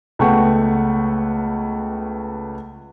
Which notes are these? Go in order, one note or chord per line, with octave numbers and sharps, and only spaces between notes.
C#2 A3 B3 F#5 G5 C#6